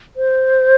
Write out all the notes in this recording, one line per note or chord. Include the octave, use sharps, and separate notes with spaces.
C5